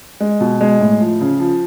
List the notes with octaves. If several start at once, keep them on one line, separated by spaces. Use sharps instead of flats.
G#3
B2
G#3
A2
F3
C#3
F3